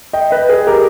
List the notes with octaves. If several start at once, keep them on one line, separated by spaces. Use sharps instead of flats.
D#5 G5
B4 D#5
G#4 B4
G4 A#4